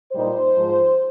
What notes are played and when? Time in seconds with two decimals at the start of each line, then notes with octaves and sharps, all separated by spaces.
0.13 A#2 G3 A#3 D#4 C5
0.55 G#2 F3 G#3